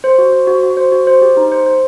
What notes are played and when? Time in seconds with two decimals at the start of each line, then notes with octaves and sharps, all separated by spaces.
0.04 C5
0.18 F#4
0.32 C5
0.47 F#4
0.63 F#4
0.77 C5
0.92 F#4
1.07 C5
1.22 G4
1.37 D#4
1.52 C5
1.66 C5